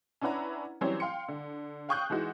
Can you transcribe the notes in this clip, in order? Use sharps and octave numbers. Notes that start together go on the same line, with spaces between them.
C#4 D4 E4 B4 F#5 A#5
E3 F#3 G3 C4 C#4 C#5
F5 G5 C6 C#7
D3
F5 G5 C#6 D#6 F#6 G6
E3 G#3 D#4 F#4